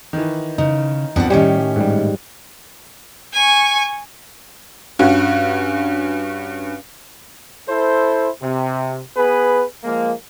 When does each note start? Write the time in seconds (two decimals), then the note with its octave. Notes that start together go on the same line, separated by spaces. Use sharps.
0.13 D#3 E3
0.58 C#3 D#4
1.16 F2 B2 D4 F#5
1.30 A2 D#3 G3 C#4 G4
1.76 G#2 G3
3.33 G#5 C#6
4.99 G2 C#4 F#4
7.69 E4 A4 C5
8.42 C3
9.17 B3 G#4 B4
9.84 F3 G#3 A#3